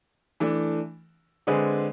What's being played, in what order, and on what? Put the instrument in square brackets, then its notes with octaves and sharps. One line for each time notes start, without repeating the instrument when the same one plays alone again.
[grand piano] E3 A3 D4
D3 G#3 C4 G#4 B4